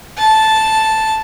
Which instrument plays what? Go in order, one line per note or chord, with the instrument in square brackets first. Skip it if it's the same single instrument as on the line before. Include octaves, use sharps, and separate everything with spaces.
[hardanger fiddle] A5